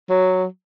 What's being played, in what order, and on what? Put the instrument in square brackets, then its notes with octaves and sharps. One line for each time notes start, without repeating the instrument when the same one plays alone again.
[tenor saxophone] F#3